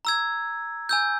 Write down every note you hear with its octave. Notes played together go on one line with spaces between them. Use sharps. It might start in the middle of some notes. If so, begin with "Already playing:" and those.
A#5 E6 G#6
G#5 E6 G6